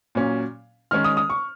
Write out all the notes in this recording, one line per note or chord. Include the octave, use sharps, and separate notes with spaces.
A#2 F#3 C#4
D#3 G#3 C#4 F6
D#6
D#6
C#6